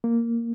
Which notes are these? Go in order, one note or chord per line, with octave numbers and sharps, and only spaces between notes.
A#3